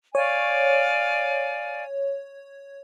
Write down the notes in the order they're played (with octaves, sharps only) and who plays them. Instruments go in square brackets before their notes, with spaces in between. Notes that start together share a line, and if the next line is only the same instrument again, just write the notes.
[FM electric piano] C#5 [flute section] D5 F5 G#5